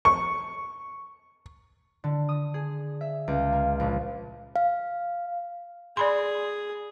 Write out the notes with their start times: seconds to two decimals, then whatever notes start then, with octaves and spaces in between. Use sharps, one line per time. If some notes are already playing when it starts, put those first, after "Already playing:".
0.05 C#6
2.04 D3
2.29 D#6
2.54 G#4
3.01 E5
3.28 C#2
3.53 A#3
3.80 A#1
4.56 F5
5.97 G#4 D5 B5 C6